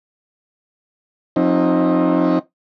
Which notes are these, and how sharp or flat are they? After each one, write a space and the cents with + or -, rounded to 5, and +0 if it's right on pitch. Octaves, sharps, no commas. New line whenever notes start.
F3 +30 C4 +30 D#4 +0